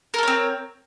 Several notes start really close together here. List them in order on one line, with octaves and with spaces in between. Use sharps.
A#4 A4 C#5 C4